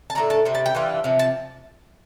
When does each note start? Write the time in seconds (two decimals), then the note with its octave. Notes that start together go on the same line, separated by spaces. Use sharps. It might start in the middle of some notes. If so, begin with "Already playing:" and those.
0.10 A5
0.15 A2 F3 A3 D4 A#5
0.30 A5
0.45 C3 G3
0.55 A5
0.66 G5
0.75 E3 G3 D4 F4
1.04 C3 F3
1.19 A5